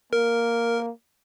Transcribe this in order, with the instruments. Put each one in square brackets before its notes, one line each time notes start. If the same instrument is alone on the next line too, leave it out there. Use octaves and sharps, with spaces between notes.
[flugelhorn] A#3 [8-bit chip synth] A#4